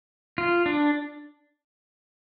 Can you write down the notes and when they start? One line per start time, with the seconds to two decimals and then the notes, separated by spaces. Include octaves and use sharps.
0.38 F4
0.66 D4